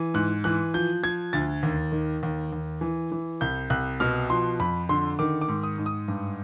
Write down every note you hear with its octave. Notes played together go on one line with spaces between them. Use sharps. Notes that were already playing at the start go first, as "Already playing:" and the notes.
Already playing: E3
G#2 F#6
E3 F#6
F3 G6
F3 G#6
D2 A6
D#2
D#3
D#2
D#2
E3
E3
C2 G6
C2 F#6
B2 F6
F3 C6
F2 B5
D3 C6
D#3 D6
D6
G#2
D#6
G#2
D#6
G2